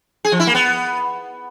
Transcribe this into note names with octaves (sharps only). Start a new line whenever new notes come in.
G#4
F3
E4
A#3
B3